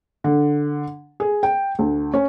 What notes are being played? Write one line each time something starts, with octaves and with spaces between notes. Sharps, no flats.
D3
G#4
G5
D2
C#4